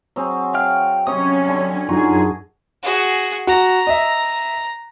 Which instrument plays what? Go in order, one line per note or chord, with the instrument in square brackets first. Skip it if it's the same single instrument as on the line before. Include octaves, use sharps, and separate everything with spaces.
[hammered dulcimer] F#3 C4 G#4
[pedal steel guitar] F5 G5 F6
[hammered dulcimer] C3 C#5 G5 [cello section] F#3 C#4 [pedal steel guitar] D#6
[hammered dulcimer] D3
[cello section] F#2 G#4 [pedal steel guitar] D#4 F4 [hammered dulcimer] F#4
[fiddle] F#4 G#4
[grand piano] F#4 [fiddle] A#5
[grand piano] D#5 E5